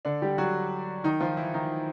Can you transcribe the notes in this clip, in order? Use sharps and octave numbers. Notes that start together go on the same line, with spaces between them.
D3 D4
G3 G4
F#3 F#4
D#3 D#4
F3 F4
E3 E4
D#3 D#4